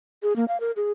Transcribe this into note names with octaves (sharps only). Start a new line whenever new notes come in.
G#4
A#3
F5
A#4
G#4